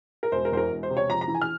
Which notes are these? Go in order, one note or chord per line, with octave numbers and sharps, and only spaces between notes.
A#4
E1 C5
A#4
E2 C5
A#4
E1
C5
C3
C#5
F2 A#5
A#5
E3
G#5
F6